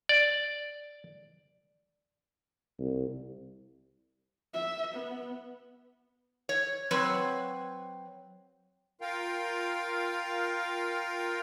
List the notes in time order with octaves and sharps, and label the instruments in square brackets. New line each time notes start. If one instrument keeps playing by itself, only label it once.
[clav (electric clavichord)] D5
[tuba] C2
[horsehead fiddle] E5
B3
[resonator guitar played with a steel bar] C#5
F#3 C4 B4 C#5
[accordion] F4 A#4 F5 G5